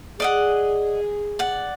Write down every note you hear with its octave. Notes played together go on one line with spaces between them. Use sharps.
G#4 D5 D#5 F#5
D5 F#5